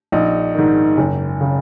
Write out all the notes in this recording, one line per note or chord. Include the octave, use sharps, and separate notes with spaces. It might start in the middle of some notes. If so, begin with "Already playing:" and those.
A#1 D#4
G#2 D#3
F#1
C#3